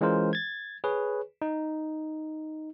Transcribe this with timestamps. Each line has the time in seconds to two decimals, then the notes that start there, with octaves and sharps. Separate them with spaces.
0.01 E3 G#3 C#4 F4 A#4 C5
0.33 G#6 A6
0.84 G#4 B4 C#5
1.42 D#4